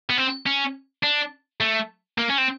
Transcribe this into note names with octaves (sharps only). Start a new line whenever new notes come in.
B3
C4
C#4
D4
A3
A#3
C#4
C4